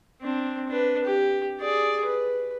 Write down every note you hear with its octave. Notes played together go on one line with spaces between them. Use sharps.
C4 D4
D4 B4
G4
G#4 D5
B4